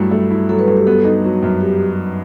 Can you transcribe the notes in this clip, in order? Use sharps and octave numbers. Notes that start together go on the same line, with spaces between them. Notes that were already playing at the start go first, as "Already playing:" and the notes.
Already playing: G2 F#3 A3 E4
A3
E4
F#3 A4
B4
G2 A4
G4
B3 A4
D#4
F#3
F#2
G4